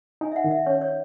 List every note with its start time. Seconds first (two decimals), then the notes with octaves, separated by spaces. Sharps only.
0.21 D#4 G#5
0.32 E5
0.36 F#5
0.44 D#3
0.51 E5
0.66 C#4 C#5
0.81 C#5